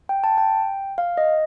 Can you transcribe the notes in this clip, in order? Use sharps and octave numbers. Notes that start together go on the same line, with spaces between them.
G5
A5
G5
F5
D#5